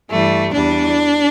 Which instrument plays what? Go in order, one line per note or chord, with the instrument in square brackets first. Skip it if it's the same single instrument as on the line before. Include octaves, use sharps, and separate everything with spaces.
[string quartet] G2 E3 G3 A3
E2 E3 G3 D4